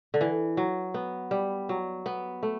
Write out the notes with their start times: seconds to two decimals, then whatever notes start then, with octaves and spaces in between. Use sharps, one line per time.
0.14 D3
0.21 E3
0.57 F#3
0.94 B3
1.31 G3
1.69 F#3
2.06 B3
2.43 A3